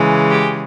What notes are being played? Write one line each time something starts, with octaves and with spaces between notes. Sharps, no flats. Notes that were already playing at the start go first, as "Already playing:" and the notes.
Already playing: C#3 E3 G#3
G4